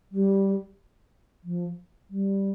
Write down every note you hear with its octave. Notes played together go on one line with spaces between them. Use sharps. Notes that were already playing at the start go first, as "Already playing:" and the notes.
G3
F3
G3